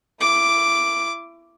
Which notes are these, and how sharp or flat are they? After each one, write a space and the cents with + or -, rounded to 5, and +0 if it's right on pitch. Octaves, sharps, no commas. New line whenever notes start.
E4 +30 D6 +0